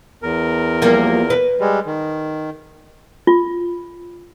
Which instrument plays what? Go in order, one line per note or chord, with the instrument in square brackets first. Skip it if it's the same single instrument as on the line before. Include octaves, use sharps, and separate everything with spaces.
[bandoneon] E2 A#4
[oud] F3 G3 A#3
B4
[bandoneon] G3 G#3
D#3
[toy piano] F4